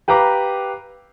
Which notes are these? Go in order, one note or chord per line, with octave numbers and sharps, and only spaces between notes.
G4 B4 F5 A#5 D6